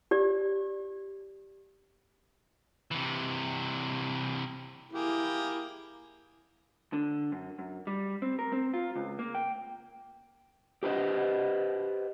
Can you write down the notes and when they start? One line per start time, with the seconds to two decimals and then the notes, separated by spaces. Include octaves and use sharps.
0.11 G4 D5
2.91 C3 E3
4.93 A#3 E4 G4 G#4
6.93 D3
7.32 F#2
7.59 F#2
7.87 G3
8.22 C4
8.39 A#4
8.52 C4
8.74 F4
8.96 C#2
9.19 A#3
9.35 G5
10.83 G4 B4 C5 D#5